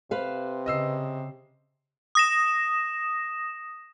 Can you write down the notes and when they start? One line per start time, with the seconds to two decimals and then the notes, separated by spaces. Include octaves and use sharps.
0.11 C3 B4 C5 F5
0.66 C#3 D#5 E6 C7
2.15 D#6 A#6 E7